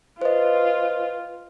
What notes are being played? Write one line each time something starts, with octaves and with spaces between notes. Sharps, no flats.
F4 B4 C5 D#5